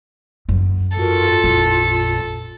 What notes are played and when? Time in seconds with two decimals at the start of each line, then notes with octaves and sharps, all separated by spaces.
0.49 F#2
0.97 G#2 F4 F#4 A4 A#4
1.44 A1 F2 A#2 E4